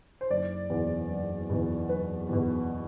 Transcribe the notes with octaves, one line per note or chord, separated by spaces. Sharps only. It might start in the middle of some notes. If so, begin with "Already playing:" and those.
C5
F#1 D5
E2 B2
F#1
E2 B2
F#1 B4
E2 B2